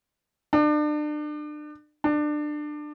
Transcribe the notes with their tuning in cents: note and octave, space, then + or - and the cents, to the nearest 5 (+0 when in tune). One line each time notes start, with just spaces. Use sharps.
D4 +35
D4 +25